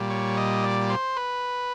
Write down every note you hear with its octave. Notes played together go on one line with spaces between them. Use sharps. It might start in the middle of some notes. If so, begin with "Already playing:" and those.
Already playing: A#2 G3
C#5
D#5
D5
C5
B4